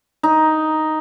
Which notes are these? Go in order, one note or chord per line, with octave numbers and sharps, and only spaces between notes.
D#4